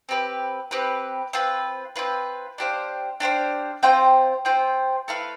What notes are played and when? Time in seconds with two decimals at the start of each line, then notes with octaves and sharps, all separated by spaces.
0.09 C4 G4 B4
0.71 C4 G4 B4
1.33 C4 F4 B4
1.96 C4 F4 B4
2.58 D4 G4 C5 F5
3.20 D4 G4 C5 F5
3.83 C4 F4 C5 G5
4.45 C4 F4 C5 G5
5.08 A3 E4 B4 F5